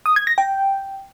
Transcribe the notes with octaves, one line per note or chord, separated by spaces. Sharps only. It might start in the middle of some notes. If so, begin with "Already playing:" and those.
D#6
G#6
A#6
G5